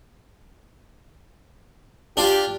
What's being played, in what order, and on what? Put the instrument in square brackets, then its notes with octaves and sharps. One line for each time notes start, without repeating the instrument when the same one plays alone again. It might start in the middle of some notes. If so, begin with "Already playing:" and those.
[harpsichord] D4 F4 [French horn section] G4